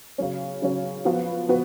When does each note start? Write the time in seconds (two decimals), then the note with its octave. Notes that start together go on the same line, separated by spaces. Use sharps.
0.18 C#3 F#3 C#4
0.62 C#3 F#3 C#4
1.05 F3 B3 F#4 B4 F5
1.49 F3 B3 F#4 B4